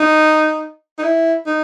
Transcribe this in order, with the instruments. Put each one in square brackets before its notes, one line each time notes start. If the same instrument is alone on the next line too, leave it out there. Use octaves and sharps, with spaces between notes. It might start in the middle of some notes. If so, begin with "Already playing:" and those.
Already playing: [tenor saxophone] D#4
D#4
E4
D#4